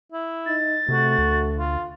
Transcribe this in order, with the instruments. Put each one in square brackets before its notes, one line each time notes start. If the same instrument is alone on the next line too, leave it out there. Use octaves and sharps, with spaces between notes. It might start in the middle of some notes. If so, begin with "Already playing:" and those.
[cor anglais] E4
[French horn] D#4 [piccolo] A6
[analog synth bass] C3 [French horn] A3 [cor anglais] F#4
[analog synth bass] D2
[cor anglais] F4